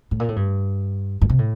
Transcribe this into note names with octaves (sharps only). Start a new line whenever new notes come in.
A2
A#2
A2
G2
G2
C3
A2